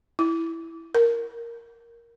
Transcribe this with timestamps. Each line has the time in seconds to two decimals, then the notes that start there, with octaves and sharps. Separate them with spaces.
0.19 E4
0.95 A#4